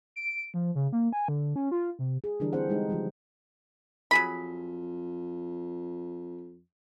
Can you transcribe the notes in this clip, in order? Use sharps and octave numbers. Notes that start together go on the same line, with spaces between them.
D7
F3
C#3
A#3
G#5
D3
C#4
F4
C3
G#4
D3 E3 G3 D4 A#4
C4 G#4 C5 F#5
G3 G#3 D#4
C#3 F3 G3
F2 F#3 G#4 B5